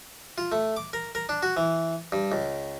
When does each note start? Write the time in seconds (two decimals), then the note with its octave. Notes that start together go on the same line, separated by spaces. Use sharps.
0.38 F4
0.52 A3
0.77 D6
0.93 A#4
1.15 A#4
1.29 D4
1.43 F#4
1.57 E3
2.12 G2
2.32 C#2